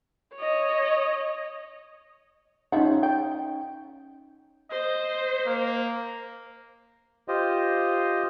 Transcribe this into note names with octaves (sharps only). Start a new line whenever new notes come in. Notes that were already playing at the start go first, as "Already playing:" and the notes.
C#5 D#5
F3 C#4 D#4 E5 F#5
G5
C5 D#5
A#3
F4 G4 C5 D#5